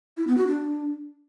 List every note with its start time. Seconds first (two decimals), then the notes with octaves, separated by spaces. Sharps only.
0.17 E4
0.27 B3
0.38 F#4
0.48 D4